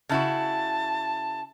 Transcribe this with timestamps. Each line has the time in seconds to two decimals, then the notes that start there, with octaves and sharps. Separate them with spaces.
0.09 C#3 E4 F#4 A5